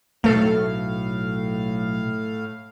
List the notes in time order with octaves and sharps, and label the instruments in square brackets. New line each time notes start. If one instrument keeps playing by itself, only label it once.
[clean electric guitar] B1 F2 [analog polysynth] A2 F5 [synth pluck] A3 A4